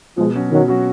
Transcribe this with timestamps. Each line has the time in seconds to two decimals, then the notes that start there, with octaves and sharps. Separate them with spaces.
0.18 B2 F3 G#3
0.35 F#3 C#4 F#4
0.52 B2 D#3 F#3
0.68 F#3 C#4 F#4